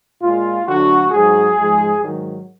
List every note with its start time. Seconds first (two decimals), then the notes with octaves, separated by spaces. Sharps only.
0.22 A#2 G#3 F4
0.67 D2 D3 F#3 F#4
1.12 G#2 F#3 G#4
1.56 G#2 F3 G#3
2.02 G#2 D#3 F#3